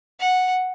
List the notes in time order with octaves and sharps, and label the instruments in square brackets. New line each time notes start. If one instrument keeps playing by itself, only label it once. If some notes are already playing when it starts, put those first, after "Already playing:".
[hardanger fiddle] F#5